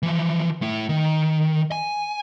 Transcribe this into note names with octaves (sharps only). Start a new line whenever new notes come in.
E3 F3
A3 E4
D#3
G#5